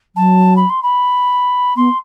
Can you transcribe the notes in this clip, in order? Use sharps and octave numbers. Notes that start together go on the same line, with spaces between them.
F#3 A5
B5
C6
B5
B3 C6